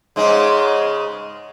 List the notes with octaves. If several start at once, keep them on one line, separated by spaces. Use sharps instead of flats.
G#2 C#3 G#3